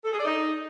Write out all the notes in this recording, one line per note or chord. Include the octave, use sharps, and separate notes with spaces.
A4
G#4
D5
D#4